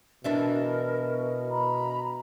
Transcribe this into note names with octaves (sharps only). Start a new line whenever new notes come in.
B2 E3 D4 E4 A#4
A#5 B5